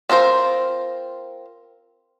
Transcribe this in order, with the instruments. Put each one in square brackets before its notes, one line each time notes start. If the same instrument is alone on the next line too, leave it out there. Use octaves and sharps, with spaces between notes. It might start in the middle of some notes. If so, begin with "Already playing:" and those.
[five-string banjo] C4 F4 A#4 C5